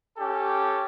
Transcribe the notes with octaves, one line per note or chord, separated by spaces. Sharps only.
C#4 G4 A4